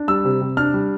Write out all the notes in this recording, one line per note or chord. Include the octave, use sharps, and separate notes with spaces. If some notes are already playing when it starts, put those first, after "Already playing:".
Already playing: D4
G3 E6
C3
C3
D4 F6
G3